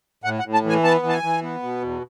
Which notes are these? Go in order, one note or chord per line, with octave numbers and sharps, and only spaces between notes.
A2 F#5
F#5
A2
A5
E3 G#5
B3 A5
E3
A5
G#5
E3
B3
B2
E2